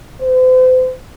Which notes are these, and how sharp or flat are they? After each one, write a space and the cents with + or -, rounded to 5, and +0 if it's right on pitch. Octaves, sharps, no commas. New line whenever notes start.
C5 -40